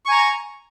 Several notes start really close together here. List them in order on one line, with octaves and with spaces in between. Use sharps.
C#6 G#5 A#5